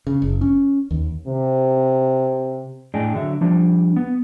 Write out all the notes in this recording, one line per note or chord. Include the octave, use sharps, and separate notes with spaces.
C#3
F#1
C#4
D#2
C3
A2 D4 G#4 D#5 G5
D3 F#3 E5
F3 G3 D4
B3